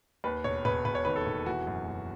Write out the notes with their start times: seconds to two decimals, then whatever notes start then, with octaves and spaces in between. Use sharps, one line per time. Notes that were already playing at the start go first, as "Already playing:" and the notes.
0.24 D#2 B4
0.44 E1 C#5
0.65 E1 B4
0.85 E1 B4
0.95 C#5
1.05 D#3 B4
1.16 A4
1.26 E1
1.46 E3 F#4
1.67 F#2
1.88 F#2